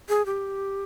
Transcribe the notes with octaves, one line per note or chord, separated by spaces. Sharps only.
G#4
G4